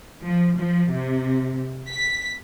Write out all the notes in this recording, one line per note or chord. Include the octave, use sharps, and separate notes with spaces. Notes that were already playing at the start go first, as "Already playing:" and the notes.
F3
F3
C3
B6